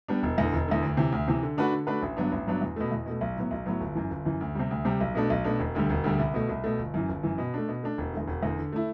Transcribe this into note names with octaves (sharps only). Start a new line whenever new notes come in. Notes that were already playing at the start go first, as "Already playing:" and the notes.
G3 B3 D4
E1
E2 D3
E1
E2 D3
D2
C3 E3
D2
C3 E3
D3
A3 D4 F#4 B4
D3
A3 D4 F#4 B4
A1
G2 F#3 B3 D4
A1
G2 F#3 B3 D4
E2
B2 A3
E2
B2 A3
B1
A2 F#3 B3
B1
A2 F#3 B3
G1
F#2 E3
G1
F#2 E3
D2
C3 G3
D2
C3 G3
B1
B2 A3 D4
B1
B2 A3 D4
E1
D2 D3 G3
E1
D2 D3 G3
C2
B2 A3
C2
B2 A3
G1
F#2 E3
G1
F#2 E3
B2
A3 D4
B2
A3 D4
E1
E2 D3
E1
E2 D3
D3
A3 E4